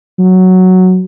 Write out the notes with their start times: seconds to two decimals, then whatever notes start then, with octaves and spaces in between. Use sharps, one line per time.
0.19 F#3